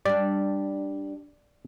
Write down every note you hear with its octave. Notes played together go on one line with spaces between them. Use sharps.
G3 D4 D5